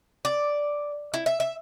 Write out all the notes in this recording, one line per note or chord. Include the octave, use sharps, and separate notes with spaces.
D5
E4
E5
E5